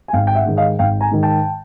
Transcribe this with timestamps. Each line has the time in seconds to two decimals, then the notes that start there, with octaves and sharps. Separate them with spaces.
0.08 G#5
0.13 G#1 F5 G5
0.27 G5
0.35 E5 F#5
0.46 G#2 D#3 G#3
0.57 D#5 F5
0.79 G#1 F5 G5
1.01 G#5 A#5
1.11 G#2 D#3 G#3
1.23 G5 A5